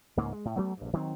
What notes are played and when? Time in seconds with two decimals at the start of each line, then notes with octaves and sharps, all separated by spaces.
0.17 C#2 G#2 C#3 A#3
0.32 G#3
0.45 A2
0.57 F#3 A3 B3
0.77 A#1 G2
0.93 D#3 F#3 G#3 C4